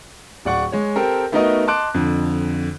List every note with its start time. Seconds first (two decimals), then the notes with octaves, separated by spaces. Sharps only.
0.45 D1 D5 F#5 C#6
0.72 G#3 C#5
0.96 C4 G4 A4 A#4 C5
1.32 A3 B3 D#4 F#4 A#4 D#5
1.67 D#5 A5 C6 D6 F#6 D7
1.94 F2 D3